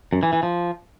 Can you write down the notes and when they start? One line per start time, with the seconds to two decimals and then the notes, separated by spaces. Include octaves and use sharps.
0.13 F#2
0.23 E3
0.33 E3
0.43 F3